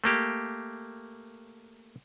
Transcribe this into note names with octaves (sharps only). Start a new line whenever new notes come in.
A3 A#3 G4